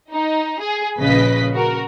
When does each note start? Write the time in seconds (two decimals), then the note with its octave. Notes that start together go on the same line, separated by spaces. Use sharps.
0.11 D#4
0.60 G#4
0.98 A#1 C#3 B4 D#5 B6
1.54 F#4 A#4